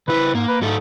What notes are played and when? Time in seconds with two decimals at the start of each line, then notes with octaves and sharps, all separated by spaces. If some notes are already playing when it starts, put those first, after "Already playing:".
0.08 C#3 E4 B4
0.35 G#2 A#3
0.48 B4
0.62 G#2 F#3 A3 A4